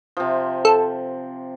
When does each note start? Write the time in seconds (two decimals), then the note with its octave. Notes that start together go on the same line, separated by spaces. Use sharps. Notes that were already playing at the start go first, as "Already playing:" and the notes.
0.17 C3 F3
0.65 A4